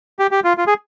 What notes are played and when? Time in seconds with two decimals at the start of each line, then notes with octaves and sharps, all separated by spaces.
0.19 G4
0.31 G4
0.44 F4
0.58 F4
0.67 G#4